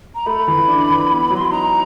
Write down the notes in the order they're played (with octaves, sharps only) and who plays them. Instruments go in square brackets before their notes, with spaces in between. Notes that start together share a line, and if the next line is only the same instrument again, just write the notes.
[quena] A#5
[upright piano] A3 [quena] B5
[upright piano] E3
D4
E3
B3
F#3
[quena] C6
B5
[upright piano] D#4 [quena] A#5